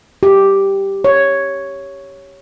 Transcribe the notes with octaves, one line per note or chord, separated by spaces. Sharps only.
G4
C#5